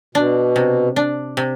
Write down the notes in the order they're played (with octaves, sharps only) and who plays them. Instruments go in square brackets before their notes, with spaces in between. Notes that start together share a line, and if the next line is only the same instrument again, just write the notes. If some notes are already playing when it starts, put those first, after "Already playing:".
[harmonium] B2 [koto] D4
[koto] C3
D4
C3